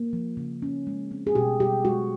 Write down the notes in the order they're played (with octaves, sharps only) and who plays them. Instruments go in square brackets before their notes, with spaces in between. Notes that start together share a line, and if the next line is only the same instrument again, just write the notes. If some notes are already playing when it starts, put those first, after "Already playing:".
Already playing: [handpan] A#3
F3
C#3
C#4
G#3
C4
G#4
B2 G4
B2 G4
G#3 F#4